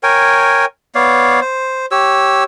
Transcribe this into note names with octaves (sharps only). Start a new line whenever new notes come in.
A#4 C#5 G5 G#5
B3 C#5 D5 F5
C5
G4 C#5 E6